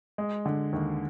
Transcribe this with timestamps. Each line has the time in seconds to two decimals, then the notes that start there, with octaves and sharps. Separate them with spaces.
0.18 G#3
0.45 D3
0.73 D#2